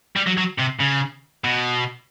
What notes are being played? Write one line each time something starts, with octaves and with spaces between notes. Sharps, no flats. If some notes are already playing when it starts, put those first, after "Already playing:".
G3
F#3
F#3
C3
C#3
B2